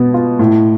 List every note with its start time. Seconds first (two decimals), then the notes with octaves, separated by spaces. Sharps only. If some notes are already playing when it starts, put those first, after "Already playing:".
Already playing: B2 B3
0.14 F4
0.39 A2